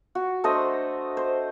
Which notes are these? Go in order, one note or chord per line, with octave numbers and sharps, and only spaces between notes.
F#4
A3 D4 C5 D#5
C5